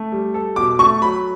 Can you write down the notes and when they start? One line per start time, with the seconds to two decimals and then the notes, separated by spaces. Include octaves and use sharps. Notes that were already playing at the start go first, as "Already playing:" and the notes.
Already playing: A3
0.12 G3
0.34 A4
0.56 B2 D6
0.79 A3 C#6
1.01 F#3 B5